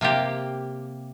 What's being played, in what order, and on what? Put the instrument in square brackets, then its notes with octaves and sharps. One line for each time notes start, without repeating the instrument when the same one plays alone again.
[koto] C3 A#3 F4 G4